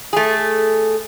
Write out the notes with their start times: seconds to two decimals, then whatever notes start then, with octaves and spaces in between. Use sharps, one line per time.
0.13 A3 G#4